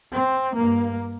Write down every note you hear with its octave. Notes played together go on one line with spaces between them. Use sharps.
C4
G2 A#3